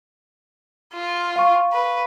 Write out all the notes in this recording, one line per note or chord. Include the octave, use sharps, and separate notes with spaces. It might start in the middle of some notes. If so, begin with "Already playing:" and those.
F4
F5 C#6
B4